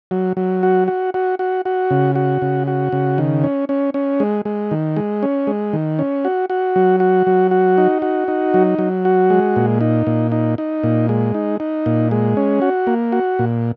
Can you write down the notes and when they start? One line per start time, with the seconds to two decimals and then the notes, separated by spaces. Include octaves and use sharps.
0.11 F#3
0.37 F#3
0.63 F#4
0.88 F#4
1.14 F#4
1.39 F#4
1.65 F#4
1.91 C#3
2.16 F#4
2.42 C#3
2.67 F#4
2.92 C#3
3.18 D#3
3.44 C#4
3.69 C#4
3.94 C#4
4.20 G#3
4.45 G#3
4.71 D#3
4.96 G#3
5.23 C#4
5.47 G#3
5.73 D#3
5.99 C#4
6.25 F#4
6.50 F#4
6.76 F#3
7.00 F#4
7.27 F#3
7.51 F#4
7.78 D#4
8.02 F#4
8.28 D#4
8.54 F#3
8.79 F#3
9.05 F#4
9.30 G#3
9.56 A#2
9.81 D#4
10.07 A#2
10.32 D#4
10.58 D#4
10.84 A#2
11.09 G#3
11.34 D#4
11.60 D#4
11.86 A#2
12.11 G#3
12.37 C#4
12.62 F#4
12.87 A#3
13.12 F#4
13.39 A#2